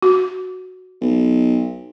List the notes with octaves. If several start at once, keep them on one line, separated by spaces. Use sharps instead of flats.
F#4
B1